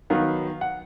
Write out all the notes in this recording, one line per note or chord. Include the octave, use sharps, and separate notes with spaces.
D#3 F#3 B3 F5
F#5